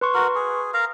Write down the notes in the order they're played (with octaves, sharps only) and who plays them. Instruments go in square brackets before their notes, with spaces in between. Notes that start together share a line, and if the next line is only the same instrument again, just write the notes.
[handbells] B4 C6 C#6
[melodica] F#4 A#4
G#4
A#4 F5 A#5